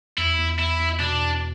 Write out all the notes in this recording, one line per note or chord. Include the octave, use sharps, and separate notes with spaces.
E2 E4
E2
E2 E4
E2
B2 D4
E2